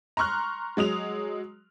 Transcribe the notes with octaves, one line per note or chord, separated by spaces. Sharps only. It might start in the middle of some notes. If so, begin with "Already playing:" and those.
A#5 C6 C#6 F6 F#6
F#3 G#3 D#6 F7